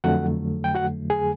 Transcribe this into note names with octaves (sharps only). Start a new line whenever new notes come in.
F2 D3 F#3 A3 F#4 F#5
G5
F#4 F#5
G#4 G#5